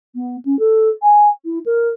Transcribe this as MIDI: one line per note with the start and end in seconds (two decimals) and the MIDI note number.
0.15 0.36 59
0.45 0.58 61
0.59 0.89 69
1.02 1.28 80
1.45 1.59 64
1.65 1.89 70